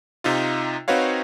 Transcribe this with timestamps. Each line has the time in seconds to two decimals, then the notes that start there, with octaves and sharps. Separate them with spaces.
0.24 C3 D#4 F4
0.88 C4 D#4 F#4 B4 C#5 F5